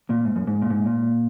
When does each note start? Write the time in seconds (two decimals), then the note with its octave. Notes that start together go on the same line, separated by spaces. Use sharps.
0.10 A#2
0.25 G#2
0.36 F#2
0.47 G#2
0.62 A#2
0.70 G#2
0.86 A#2